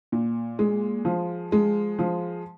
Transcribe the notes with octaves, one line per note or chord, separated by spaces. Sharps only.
A#2
G#3
F3
G#3
F3